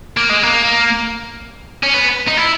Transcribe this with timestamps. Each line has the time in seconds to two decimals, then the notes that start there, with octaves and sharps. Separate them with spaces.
0.17 A#3
0.30 G#3
0.43 A#3
1.83 C#4
1.94 B3
2.28 D#4
2.38 E4